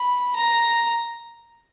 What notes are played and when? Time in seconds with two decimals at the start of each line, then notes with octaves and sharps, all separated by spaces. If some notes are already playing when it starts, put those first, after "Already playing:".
Already playing: B5
0.36 A#5